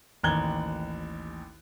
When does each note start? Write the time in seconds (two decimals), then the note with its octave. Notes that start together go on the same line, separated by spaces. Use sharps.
0.23 A1 D#2 A#5 F#6 G#6 G7